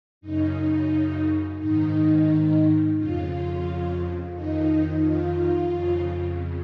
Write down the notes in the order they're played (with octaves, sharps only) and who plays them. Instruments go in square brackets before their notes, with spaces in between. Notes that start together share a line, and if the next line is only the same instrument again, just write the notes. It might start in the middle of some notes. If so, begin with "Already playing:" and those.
[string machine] F#2 C#3 D#4
G#2 D#3 D#4
F2 C#3 F4
F2 D#3 D#4
F4
F2 C#3